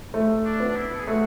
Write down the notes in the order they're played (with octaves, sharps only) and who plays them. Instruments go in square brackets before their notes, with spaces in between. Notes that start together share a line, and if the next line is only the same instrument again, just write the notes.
[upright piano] A3
[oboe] D4
[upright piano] B3
[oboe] D4
E4
A4
G#4
[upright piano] A3 [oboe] F#4